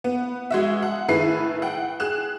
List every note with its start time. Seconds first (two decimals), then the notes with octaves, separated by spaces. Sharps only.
0.04 B3
0.51 G#3 F#4 E5
0.83 F#5
1.08 A2 D#3 G#4 B4 E5 C7
1.62 F#5 G5
2.00 G#4 F#6 E7